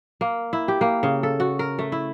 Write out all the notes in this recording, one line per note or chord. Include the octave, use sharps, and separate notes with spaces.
A#3
E4
G4
A#3
C#3
A4
F#4
A#4
A3
E4